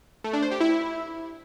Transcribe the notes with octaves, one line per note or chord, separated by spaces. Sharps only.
A3
D4
C5
G4
E4